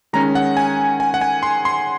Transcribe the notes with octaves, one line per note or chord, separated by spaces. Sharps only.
D#3 G#3 C#4 A#5
F#5
G#5
G#5
F#5
G#5
C6
C6